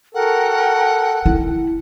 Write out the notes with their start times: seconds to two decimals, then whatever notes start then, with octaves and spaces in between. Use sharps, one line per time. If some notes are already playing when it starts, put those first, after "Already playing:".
0.15 F#4 A4 A#4 F#5 G5
1.26 E4